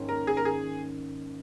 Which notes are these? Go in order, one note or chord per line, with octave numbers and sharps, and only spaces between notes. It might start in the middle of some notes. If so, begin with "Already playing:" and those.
Already playing: G#2 D#3 A#3 C#4
A#4
G#4
A#4
G#4